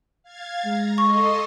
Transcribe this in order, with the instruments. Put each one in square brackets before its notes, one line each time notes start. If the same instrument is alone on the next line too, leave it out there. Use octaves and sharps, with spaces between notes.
[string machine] F5 G#6 A6
[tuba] G#3 [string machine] A#5
[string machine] A4 D#5 C6 [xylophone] C#6